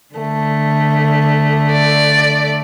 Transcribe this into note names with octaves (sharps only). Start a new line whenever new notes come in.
D3 A3
D5